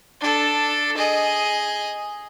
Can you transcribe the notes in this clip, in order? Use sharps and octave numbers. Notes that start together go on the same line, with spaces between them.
D4 A4
G#4 D#5